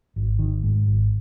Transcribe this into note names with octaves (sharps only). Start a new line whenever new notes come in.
G#1
D#3
G#2
G#1